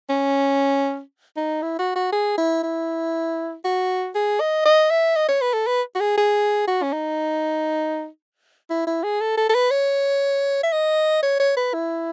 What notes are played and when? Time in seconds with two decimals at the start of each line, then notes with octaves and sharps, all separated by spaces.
0.10 C#4
1.37 D#4
1.62 E4
1.79 F#4
1.96 F#4
2.13 G#4
2.38 E4
2.63 E4
3.64 F#4
4.15 G#4
4.40 D#5
4.65 D#5
4.91 E5
5.16 D#5
5.28 C#5
5.42 B4
5.54 A4
5.67 B4
5.95 F#4
6.00 G#4
6.18 G#4
6.68 F#4
6.83 C#4
6.93 D#4
8.70 E4
8.87 E4
9.04 G#4
9.21 A4
9.37 A4
9.49 A4
9.55 B4
9.71 C#5
10.63 E5
10.72 D#5
11.23 C#5
11.40 C#5
11.57 B4
11.74 E4